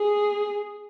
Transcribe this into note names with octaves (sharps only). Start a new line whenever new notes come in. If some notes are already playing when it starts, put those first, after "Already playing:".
Already playing: G#4